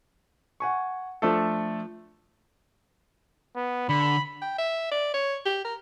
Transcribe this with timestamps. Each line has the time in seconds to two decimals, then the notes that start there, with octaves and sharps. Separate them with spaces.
0.60 F#5 G#5 C#6
1.22 F3 A3 D4 A4
3.56 B3
3.89 D3 B5
4.42 G5
4.58 E5
4.91 D5
5.14 C#5
5.46 G4
5.64 A#4